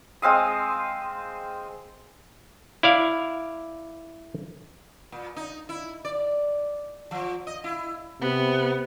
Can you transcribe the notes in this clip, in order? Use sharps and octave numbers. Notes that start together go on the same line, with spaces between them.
G#3 C4 F5 D#6
E4 D5 F5
A#2
D#4
E4
D5
F3
D#5
E4
C3 B3